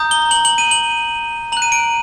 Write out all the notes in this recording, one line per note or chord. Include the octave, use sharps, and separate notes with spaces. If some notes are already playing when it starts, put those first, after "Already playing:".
Already playing: A#5 D#6 G6
G7
F#7
F#7
D#7
F#7
A#5 F#6 F#7
D#7
D7